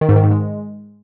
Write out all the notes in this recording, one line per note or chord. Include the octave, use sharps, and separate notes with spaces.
D#3
G#2
D#3
G#2
G#3